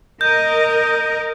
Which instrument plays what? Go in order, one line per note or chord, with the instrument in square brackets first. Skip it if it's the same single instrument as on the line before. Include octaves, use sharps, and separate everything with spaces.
[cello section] A#4 D#5 [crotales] G6